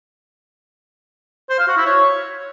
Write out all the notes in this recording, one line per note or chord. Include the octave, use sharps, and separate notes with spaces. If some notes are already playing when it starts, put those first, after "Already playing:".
C5
F5
F#4
E4
C#5